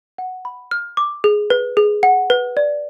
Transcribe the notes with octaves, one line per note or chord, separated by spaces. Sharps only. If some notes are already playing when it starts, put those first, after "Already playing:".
F#5
B5
F6
D6
G#4
B4
G#4
F#5
B4
D5